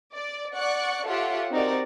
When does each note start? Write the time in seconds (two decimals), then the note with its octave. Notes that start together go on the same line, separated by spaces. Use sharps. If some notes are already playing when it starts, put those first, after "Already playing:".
0.14 D5
0.55 D5 F#5 C#6 F#6 C#7
1.06 F4 G4 A4 C#5 E5 F#5
1.51 C4 D#4 F#4 G4 A#4 D5